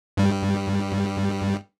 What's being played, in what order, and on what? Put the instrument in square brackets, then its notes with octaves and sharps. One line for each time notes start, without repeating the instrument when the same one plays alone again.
[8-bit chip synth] G2 G3